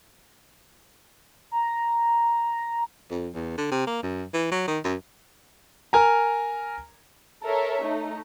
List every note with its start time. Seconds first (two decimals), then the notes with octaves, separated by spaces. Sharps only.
1.52 A#5
3.11 F2
3.34 E2
3.58 D3
3.71 C3
3.87 A#3
4.03 F#2
4.33 E3
4.52 F#3
4.68 D#3
4.84 F#2
5.93 A#4 G#5 A#5
7.44 A4 A#4 C#5 E5
7.82 A3 D#4